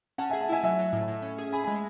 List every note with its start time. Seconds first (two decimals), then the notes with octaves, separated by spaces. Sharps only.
0.18 C#4 F#5 A5
0.30 G#4 E5 G#5
0.41 F#5 A5
0.49 E4 E5 G#5
0.63 F#3 E5 G#5
0.79 F#3
0.93 A2
1.08 A2
1.22 C#4
1.38 G#4
1.52 G#4 G#5 B5
1.63 G#5 B5
1.68 G#3